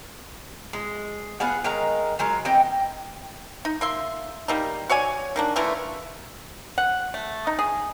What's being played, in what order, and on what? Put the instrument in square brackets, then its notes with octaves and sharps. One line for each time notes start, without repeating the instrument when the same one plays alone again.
[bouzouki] G#3
B3 F4 G#4 F#5
D#3 G#3 F5 A#5
C#3 F#3 G#3 A#4
E3 C4 D#5 G5
[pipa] D#4
A#3 E5 C6
G3 A#3 D#4
F#4 C#5 D5 G#5
D#3 A#3 D4
D3 E3 A3 A#3
F#5
A3
D#4
G#4